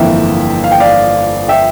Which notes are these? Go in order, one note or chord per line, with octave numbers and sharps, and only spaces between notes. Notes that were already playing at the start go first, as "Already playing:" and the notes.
Already playing: G1 F2 E3 A#3 E5 G5
F5
G5
D5 F5
E5 G5